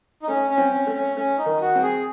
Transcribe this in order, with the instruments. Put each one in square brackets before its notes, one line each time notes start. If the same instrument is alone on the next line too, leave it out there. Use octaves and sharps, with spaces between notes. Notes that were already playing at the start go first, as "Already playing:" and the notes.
[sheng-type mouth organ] D#4
[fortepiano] A3 [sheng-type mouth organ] C#4
[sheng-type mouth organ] C#4
[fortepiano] C4
[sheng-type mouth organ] C#4
[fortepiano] A3
[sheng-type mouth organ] C#4
[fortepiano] A3 [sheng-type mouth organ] C#4
[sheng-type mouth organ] D#4
[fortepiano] D#3
[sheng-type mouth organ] F#4
[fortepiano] C4
[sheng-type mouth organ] G#4